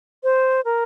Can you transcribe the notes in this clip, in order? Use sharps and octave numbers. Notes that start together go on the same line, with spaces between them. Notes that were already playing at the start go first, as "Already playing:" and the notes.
C5
A#4